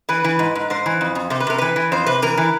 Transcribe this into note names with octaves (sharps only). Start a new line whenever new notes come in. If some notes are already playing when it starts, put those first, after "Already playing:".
E3 B4
E3
G#2
G#2
G#2 C5
E3
F2
F2
C3 C5
B4
C3 A#4
E3 B4
E3
F2 C5
C3 B4
E3 A#4
E3